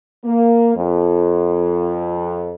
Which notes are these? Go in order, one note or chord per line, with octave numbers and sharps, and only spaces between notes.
A#3
F2